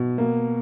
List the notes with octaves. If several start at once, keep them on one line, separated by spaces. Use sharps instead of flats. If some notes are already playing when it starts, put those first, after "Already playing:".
Already playing: B2
A#3